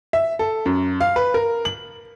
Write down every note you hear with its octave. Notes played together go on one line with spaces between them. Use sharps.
E5
A4
F#2
F5
B4
A#4
F#7